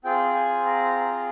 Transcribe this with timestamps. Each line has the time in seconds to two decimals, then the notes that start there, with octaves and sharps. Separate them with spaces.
0.04 C4 F4 G#4 G5
0.35 G#5
0.65 A#5
0.97 A#5